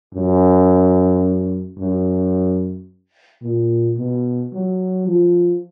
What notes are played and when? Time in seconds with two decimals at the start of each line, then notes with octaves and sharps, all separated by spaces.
0.14 F#2
1.78 F#2
3.42 A#2
3.97 B2
4.53 F#3
5.07 F3